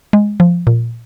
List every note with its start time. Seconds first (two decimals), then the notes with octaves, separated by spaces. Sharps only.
0.13 G#3
0.40 F3
0.67 A#2